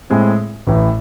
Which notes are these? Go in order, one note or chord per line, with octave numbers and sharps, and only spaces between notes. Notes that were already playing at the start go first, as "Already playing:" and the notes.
A2 G#3 C4 G#4
A1 A2 E3